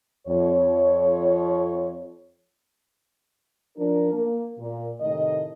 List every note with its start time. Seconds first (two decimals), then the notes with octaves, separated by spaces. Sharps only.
0.27 F2 C#5
3.78 F3 D4 A#4
4.14 A#3
4.59 A#2
5.01 A2 C3 D#3 A3 D#5